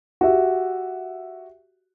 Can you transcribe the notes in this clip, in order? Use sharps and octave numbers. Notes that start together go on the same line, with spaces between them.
F#4 G4 E5